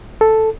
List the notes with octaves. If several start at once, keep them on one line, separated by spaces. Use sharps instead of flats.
A4